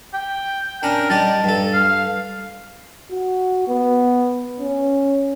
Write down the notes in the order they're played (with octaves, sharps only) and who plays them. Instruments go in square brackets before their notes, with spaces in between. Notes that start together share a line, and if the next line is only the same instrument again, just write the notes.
[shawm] G5
[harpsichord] C#4 D4 [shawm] A#4
[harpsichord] G3 D#4 G4 [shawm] A5
[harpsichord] G2 A4
[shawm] F5
[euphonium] F#4
B3
C#4